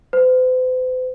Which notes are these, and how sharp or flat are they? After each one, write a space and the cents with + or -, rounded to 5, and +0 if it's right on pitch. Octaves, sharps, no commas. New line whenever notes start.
C5 -45